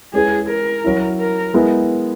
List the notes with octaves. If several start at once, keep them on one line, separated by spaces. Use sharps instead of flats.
G#3 C#4 E4 G#4 B4
A#4
F#3 C#4 E4
A#4
G#3 B3 E4 A#4